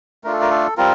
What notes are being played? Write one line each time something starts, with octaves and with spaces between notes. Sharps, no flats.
A3 D4 F4 A#4
A4
A#4
A4
G3 C4 F4 A#4